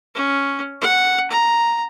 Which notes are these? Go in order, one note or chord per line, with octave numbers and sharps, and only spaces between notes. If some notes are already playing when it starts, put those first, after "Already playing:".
C#4
F#5
A#5